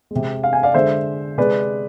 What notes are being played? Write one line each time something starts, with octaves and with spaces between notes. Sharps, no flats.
C3 G#3
F5
G#5
D5 F5
D3 G#3 C5 E5
C3 G#3 B4 D5